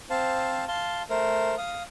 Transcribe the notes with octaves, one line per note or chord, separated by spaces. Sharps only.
C4 C5 F5 A5
F5 A5 C6
A3 A#4 C5
F5 D#6